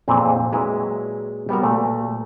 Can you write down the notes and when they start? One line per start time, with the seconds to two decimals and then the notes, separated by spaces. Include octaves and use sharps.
0.08 F2 A#2 E3 C4 G#4
0.52 A#2 F#3 G#3 E4 B4
1.49 G3 B3 F#4 A#4
1.63 A#2 A3